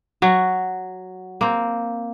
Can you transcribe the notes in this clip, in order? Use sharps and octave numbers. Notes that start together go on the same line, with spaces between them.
F#3 F#4
A#3 C4